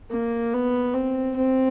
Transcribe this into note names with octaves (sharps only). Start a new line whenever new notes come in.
A#3
B3
C4
C4